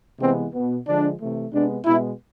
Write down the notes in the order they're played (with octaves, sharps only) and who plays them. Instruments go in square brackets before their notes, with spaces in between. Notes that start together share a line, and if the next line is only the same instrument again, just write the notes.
[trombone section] C3 E3 G#3 B3 C4
B2 B3
D3 F3 G#3 D4
C3 E3 A3
C3 G#3 B3 D4
B2 G#3 B3 E4